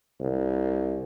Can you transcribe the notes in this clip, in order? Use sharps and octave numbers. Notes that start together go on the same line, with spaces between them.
C2